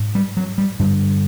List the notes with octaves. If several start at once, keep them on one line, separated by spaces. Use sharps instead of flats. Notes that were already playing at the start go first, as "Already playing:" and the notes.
Already playing: G#2
G3
F#3
G3
G2 D3 G3